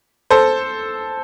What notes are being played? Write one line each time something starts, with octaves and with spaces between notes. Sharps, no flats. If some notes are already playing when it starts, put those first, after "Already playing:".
A4 C5